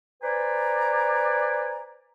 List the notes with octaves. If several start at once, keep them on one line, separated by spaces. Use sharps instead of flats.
B4 C5 D5 G#5 A#5